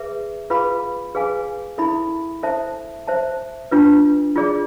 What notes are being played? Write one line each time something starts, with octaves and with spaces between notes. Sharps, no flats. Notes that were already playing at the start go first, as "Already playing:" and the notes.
Already playing: G#4 B4 E5
F4 G#4 B4 F5 B5
G#4 B4 F5 G#5
E4 A4 E5 B5
A4 C5 E5 A5
C5 E5 A5
D4 F4 B4
F4 G#4 D5